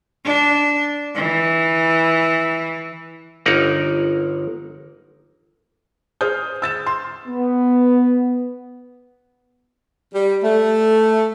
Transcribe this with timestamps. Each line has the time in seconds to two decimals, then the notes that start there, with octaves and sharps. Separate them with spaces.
0.25 D4
1.15 E3
3.46 G1 A#3 D#4 A#4 F#5
6.21 G#4 C5 D#6 F6 G6
6.62 E6 A6 E7
6.86 C6
7.28 B3
10.14 G3
10.43 A3